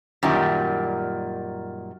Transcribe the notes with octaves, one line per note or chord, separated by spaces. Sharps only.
F#2 A#2 D#3 G3